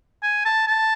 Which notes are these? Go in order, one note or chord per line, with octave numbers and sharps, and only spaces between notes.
G#5
A5
A5